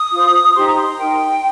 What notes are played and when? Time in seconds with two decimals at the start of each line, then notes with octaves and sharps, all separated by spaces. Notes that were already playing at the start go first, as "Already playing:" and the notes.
Already playing: D#6
0.12 F4 C5
0.55 D#4 G4 C5 C6
0.67 A#5
0.78 C6
0.98 D#4 A#4 G5